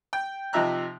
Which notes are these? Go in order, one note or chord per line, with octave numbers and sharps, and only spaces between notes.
G5
C3 F3 D#4 E5 A#5 F#6